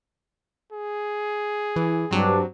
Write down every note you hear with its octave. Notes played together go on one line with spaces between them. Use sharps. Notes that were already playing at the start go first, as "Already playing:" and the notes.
G#4
E3
G2 F#3 C4 D4